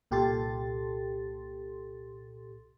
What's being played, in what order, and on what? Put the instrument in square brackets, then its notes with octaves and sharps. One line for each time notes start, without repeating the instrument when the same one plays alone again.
[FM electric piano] C2 A#2 G4 A4 C6 A6